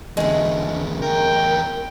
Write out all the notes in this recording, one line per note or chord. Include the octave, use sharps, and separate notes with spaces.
E2 D3 G#3 A3
E2 A#4 G5